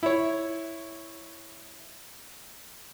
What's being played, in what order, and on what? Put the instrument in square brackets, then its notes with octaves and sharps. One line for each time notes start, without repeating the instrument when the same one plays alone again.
[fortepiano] E4 C#5